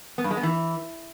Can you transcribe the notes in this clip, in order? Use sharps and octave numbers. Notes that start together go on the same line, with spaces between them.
B3
G2
G#3
B3
E3